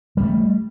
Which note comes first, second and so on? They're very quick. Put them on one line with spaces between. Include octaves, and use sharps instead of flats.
G3 A#3 A3